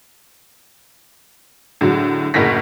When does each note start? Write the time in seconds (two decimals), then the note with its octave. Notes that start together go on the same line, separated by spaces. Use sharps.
1.81 A2 D3 F#3 G#3
2.34 F#1 D2 A2 A#4 A#6 B6